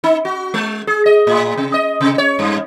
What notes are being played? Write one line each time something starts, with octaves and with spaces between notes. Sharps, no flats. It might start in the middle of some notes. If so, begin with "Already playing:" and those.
D#4
F#4
G#3
G#4
D#5
A2
C3
D#5
C3
C#5
G2